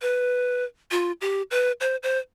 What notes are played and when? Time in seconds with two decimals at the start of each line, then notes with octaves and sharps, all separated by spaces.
0.02 B4
0.91 F4
1.21 G4
1.51 B4
1.81 C5
2.03 C5